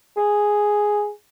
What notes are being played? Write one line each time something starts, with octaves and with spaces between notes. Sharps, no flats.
G#4